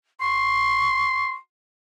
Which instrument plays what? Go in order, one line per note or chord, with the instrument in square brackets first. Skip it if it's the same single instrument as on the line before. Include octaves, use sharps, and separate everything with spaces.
[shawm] C6 [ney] C#6